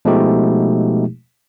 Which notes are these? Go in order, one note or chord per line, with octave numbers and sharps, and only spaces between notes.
B2 F3 G#3 A3 D#4 G4